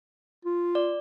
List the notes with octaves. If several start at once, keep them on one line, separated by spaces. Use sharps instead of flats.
F4
D5